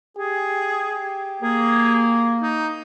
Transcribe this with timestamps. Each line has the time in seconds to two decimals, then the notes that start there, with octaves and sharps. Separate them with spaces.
0.17 G4 G#4
1.42 A#3 G#4
2.42 D#4